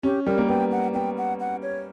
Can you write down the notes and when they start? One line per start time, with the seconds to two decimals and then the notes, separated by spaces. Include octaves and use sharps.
0.03 C#4 G4
0.26 G3 A#4
0.38 A#3
0.49 B3 G5
0.72 F#5
0.94 B3 G5
1.18 F#5
1.40 F#5
1.63 C#5